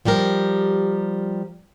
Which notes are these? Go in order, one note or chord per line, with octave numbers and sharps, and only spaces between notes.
F3 G3 G4 A#4